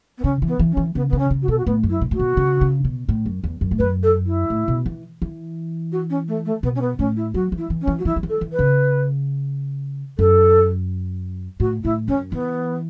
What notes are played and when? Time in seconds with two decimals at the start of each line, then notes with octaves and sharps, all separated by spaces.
0.18 B3
0.24 C#3 C#4
0.42 E3
0.47 B3
0.59 E3
0.71 C#4
0.77 E3
0.95 C#3 B3
1.09 C#3 B3
1.18 C#4
1.31 C#3
1.42 F#4
1.48 B2 A4
1.58 F#4
1.66 A2 B3
1.83 F#2
1.90 E4
2.01 B2
2.11 A2 F#4
2.19 B2
2.37 C#3
2.61 C#3
2.85 B2
3.09 A2
3.26 F#2
3.44 E2
3.61 F#2
3.71 A2
3.79 F#2 B4
4.03 A4
4.26 E4
4.50 A2
4.68 B2
4.86 E3
5.22 E3
5.92 F#4
6.10 C#4
6.28 A3
6.45 A3
6.63 B2 B3
6.75 C#4
6.81 B3
6.99 A2 C#4
7.16 E4
7.34 F#3 F#4
7.52 E3
7.58 E4
7.70 E3
7.81 C#4
7.87 E3
7.99 F#4
8.05 E3 E4
8.16 F#3
8.23 E3
8.29 A4
8.41 E3
8.53 B4
8.59 C#3
10.19 F#2 A4
11.60 A2 F#4
11.84 A2 E4
12.08 F#2 C#4
12.32 E3 B3